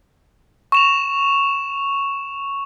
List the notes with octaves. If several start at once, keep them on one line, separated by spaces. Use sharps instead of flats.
C#6 E7 F7